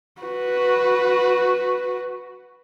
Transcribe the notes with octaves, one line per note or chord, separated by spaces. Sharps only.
F#4 B4